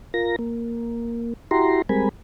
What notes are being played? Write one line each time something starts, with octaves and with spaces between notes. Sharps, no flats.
F4 A#4 A#6
A#3
E4 F#4 G4 A#5 C6
G3 G#3 C4 A#4 G#5 B5